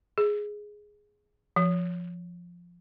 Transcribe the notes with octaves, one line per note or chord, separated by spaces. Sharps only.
G#4
F3